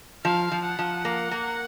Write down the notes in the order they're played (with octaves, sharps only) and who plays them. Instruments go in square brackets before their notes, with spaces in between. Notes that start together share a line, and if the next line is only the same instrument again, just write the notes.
[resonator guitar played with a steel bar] F3 [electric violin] F5
[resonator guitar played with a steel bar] F3
[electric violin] F#5
[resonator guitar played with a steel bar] F3
A#3
A#3